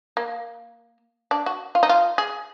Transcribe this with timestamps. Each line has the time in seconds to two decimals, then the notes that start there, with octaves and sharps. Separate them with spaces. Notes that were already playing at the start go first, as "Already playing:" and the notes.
0.17 A#3
1.31 D4
1.46 F#4
1.75 F4
1.83 D#4
1.89 F4
2.18 G#4